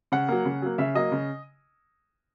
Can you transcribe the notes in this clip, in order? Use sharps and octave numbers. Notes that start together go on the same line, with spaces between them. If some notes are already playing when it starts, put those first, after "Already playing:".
C#3 F#5
F#3 A#3
C#3
F#3 A#3
C#3 E5
F#3 A#3 D#5
C#3